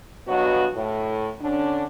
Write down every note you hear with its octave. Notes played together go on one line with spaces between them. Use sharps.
G2 F#3 B3 F#4 D#5
A2
D3 C#4 D4